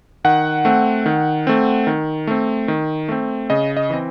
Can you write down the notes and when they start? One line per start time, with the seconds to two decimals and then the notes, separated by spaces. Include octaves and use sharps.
0.25 D#3 F#5
0.65 A3 C4
1.06 D#3
1.47 A3 C4
1.87 D#3
2.27 A3 C4
2.68 D#3
3.09 A3 C4
3.50 C#3 D#5
3.77 D#5
3.90 E3 C4